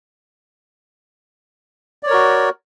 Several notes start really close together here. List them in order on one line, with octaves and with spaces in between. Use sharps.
D5 C#5 A#4 F#4